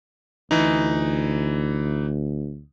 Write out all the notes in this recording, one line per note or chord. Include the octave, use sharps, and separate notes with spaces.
D2 E3 D#4